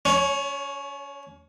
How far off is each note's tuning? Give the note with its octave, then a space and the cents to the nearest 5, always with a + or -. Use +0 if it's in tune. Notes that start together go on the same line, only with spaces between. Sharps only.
C#4 +35 C#5 -5